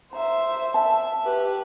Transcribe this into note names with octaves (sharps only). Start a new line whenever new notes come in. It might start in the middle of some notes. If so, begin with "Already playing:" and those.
C5 E5 A#5
E5 A5
G4 B4